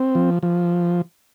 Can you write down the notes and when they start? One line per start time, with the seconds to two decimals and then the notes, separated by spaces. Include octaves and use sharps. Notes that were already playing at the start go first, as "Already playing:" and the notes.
Already playing: C4
0.15 F3
0.43 F3